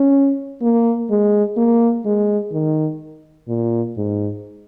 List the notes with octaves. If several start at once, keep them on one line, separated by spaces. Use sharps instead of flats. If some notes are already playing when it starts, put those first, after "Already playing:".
Already playing: C#4
A#3
G#3
A#3
G#3
D#3
A#2
G#2